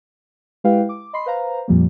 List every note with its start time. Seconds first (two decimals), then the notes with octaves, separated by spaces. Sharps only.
0.64 G#3 E4 G4 B4 F5 G5
0.89 D6
1.13 D#5 B5 C6 C7
1.26 B4 C5 F5 A#5
1.68 F2 A#2 F3 G3 A#3